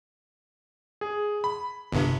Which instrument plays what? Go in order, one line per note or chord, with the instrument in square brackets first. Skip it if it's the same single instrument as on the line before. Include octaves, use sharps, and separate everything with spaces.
[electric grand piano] G#4
B5
[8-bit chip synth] G1 G2 C3